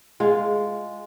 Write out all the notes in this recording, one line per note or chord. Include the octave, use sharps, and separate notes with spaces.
G#3 F4